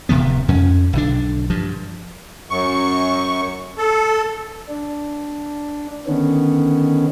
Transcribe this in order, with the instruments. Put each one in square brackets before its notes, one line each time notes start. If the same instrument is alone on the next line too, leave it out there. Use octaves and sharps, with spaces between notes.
[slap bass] D1 C3 F3 B3
F2 F3 C#4
B1 D3 D4
G2 F3
[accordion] F#2 C#6
A4
[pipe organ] D4
D3 D#3 B3 C#4